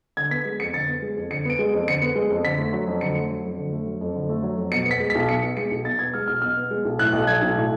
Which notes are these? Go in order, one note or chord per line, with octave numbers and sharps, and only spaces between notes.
D3 G#6
B3 B6
G#3
F2 C#7
D3 A6
B3
G#3
F2
D3 C#7
B3 D7
G#3
F2
D3 C#7
B3
G#3
F2
D3 B6
A3
F#3
F2
D3 C#7
A3
F#3
F2
D3
A3
F#3
F2
D3
A3
F#3
F2
B2 C#7
B3
B6
G#3
B1 B6
B2 C#7
B3
G#3 C#7
B1
B2 A6
B3 G#6
G#3 F6
B1 F6
B2 F6
B3
G#3
B1
A2 F#6
B1
F#3 G#6
B1
A2